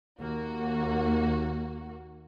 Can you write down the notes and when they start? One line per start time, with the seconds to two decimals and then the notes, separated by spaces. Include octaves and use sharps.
0.20 D#2 A#3 F#4